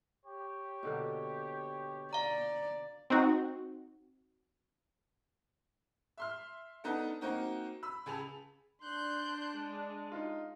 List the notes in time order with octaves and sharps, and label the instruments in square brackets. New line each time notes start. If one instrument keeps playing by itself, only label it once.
[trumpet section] G4 C#5
[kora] B2 D3 A#3
[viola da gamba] D5 [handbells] F5 A#5
[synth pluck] C4 D#4 F#4
[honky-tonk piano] E5 C6 F6
B3 D4 D#4 A4 F#5
A#3 C4 D#4 F#4
B5 E6
C#2 G#4 A5 B5 F7
[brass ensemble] D4 [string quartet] C6 F#6 G6
[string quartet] G#3
[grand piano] D#4 F4